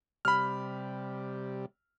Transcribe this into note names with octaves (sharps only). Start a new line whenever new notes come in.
C3 G3 B5 F6